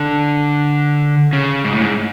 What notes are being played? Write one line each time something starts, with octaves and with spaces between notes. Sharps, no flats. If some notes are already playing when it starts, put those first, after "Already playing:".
Already playing: D3
C#3
G#2
A2
G#2